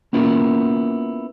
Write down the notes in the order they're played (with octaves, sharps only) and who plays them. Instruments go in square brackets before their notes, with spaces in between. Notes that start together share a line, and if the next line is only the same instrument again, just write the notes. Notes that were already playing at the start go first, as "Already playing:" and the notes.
[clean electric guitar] A#3 B3 C#4 E4 F4 A#4